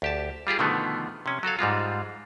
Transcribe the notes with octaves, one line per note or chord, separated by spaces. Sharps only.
D2 G4 A5
G3 F4 G4 G#4
B2 D3 D#3 F3 A3 B3
C3 C#4
F#3 F#4 A4 F5
G#2 G3 G#3 F4